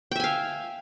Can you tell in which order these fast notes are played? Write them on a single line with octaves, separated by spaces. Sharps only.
G5 E5 G#5 F5